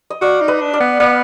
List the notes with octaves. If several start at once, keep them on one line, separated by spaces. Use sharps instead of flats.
D#5
F#4 D5 F5
D#4
B4 D#5
D4
D5 F5
B3
B3 D5 F5